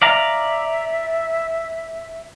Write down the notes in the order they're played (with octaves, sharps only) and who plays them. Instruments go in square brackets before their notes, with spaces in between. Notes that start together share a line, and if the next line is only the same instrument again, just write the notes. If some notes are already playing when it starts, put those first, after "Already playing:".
[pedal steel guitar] D5 F5 A#5 [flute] E5